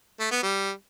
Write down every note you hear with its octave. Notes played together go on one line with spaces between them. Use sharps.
A3
B3
G3